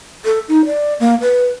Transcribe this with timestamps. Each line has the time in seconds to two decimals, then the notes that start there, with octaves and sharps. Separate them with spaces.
0.25 A4
0.48 D#4
0.66 D5
1.00 A#3
1.21 B4